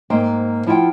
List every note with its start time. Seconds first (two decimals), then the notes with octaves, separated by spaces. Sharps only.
0.10 G#2 A#3 C5 G5
0.66 F3 E4 F4 F#5 G5